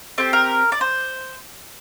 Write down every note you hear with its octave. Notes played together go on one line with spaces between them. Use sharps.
C4 G4 A4
A#4
D5
C5